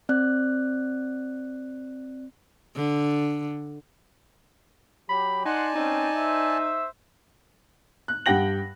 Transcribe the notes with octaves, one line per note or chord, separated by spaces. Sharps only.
C4 D5 F#6
D3
F#3 G4 B5
D#4 D5 F#5 G#5 A5 C6
C4 C#4 D#4
C5 E5
F#6
G2 G4 F#5 G5 A#6 F#7